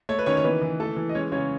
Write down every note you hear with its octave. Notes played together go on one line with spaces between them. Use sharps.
A3 C#5
B4
D#3 C#4 C#5
C#5
E3 B3 B4
E3
E3 A3 A4
E3
D#5
G#3 C#4 C#5
C#3 C#4 C#5